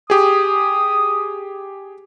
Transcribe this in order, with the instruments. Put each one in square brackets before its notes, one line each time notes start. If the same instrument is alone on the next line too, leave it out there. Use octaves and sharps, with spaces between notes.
[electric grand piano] G4 G#4 [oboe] D#6